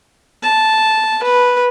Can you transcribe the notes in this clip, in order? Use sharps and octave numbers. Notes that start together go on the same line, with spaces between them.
A5
B4